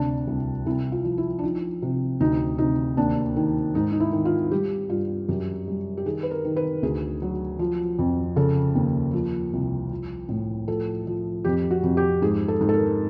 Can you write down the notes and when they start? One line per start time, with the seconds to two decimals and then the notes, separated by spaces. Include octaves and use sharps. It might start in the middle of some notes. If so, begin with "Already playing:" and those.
Already playing: D2 C3 D4
0.27 C2
0.66 C2 E4
0.92 F4
1.05 F3
1.18 E4
1.39 D4
1.43 F3 D#4
1.82 C3
2.20 D2 D#4
2.58 C3 D#4
2.97 D#2 D4
3.36 D#3
3.75 G#2 D#4
3.92 D#4
4.00 E4
4.13 D#3
4.25 F4
4.51 G3 G4
4.90 G2 F4
5.29 F#2 G4
5.68 G3
5.97 G4
6.05 D#3 G#4
6.23 B4
6.31 A#4
6.45 D#3
6.56 B4
6.82 D2 G#4
7.22 F#3
7.59 F3
7.99 F2
8.36 C#3 A4
8.75 D#2
9.13 F3
9.53 C2
9.91 F3
10.29 A2
10.68 F3 A4
11.07 F3
11.45 F2 G4
11.71 F#4
11.83 F2
11.97 G4
12.22 G#2 G#4
12.48 A4
12.61 G#2
12.69 A4
12.74 A#4